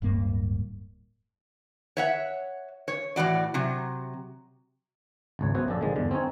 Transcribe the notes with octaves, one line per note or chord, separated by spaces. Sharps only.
D1 G2 A#3
C#5 E5 F#5
C#5
A2 E3 F#4 D5
C3 F#3
G#1 C#2 C#5
F#3 B3 F#4 C5 C#5 E5
A#1 F#2 D4 A4
D3 D#3 F3 G#3
E2 G2 D3
C4 C#4 D#4 C#5